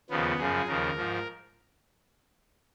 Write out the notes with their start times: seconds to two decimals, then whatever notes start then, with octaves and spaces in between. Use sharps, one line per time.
0.10 D#2 C#3 F3 B3
0.38 F#2 C#3 F3 G#4
0.67 D#2 C#3 F3 A#4
0.95 G#2 F3